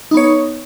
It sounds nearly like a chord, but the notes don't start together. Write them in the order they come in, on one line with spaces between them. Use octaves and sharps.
D#4 B3 C#5